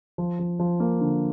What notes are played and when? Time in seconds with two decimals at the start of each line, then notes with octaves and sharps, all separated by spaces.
0.18 F3
0.39 F3
0.59 F3
0.80 A#3
1.01 D3